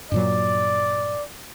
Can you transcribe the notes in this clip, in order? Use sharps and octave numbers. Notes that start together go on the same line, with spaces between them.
G2 A#2 F#3 D5